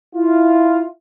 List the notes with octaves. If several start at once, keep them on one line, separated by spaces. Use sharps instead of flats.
E4 F4